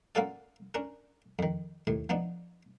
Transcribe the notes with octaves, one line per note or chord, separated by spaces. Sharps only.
A#3 C#4 F4 F#4 A4 D5
C#4 D4 A#4
F2 D#3
D#2 A2
F3 B3 D4 D#4